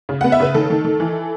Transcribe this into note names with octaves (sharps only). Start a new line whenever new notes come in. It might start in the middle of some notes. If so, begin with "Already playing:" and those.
C#3
B3 F#5
E5
C#3 B4
D#3 A4
D#3
D#3
E3